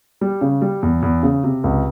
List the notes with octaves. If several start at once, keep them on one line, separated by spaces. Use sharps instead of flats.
G3
C#3
G3
E2
E2
C#3
C3
C#2